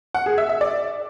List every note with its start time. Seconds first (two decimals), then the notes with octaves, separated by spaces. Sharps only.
0.14 F#5
0.26 G#4
0.38 E5
0.49 E5
0.61 D5